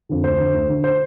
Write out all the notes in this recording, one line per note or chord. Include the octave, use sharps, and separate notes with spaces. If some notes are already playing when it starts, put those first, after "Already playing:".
F2 D3
D2 C5
D3
D2
D3
C5